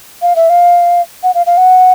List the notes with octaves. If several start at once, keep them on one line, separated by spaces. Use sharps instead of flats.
F5
E5
F5
F#5
F5
F5
F#5